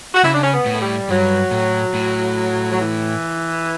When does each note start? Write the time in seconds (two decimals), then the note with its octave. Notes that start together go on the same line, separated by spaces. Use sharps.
0.14 F#4
0.23 C#3 E4
0.33 D4
0.43 C#4
0.53 B3
0.66 A2
0.73 A3
0.80 G3
1.09 G2 F#3
1.51 A2
1.94 A2
2.72 F#3
2.79 E3